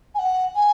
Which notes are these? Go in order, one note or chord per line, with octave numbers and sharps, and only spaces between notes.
G#5
F#5
G#5